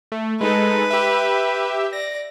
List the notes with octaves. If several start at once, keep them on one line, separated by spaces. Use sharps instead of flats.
A3
G#3 D#4 A4 B4
G4 E5
D5 A#6